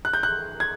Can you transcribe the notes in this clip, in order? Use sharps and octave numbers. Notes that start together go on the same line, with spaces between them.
F#6
G6
F#6
G#6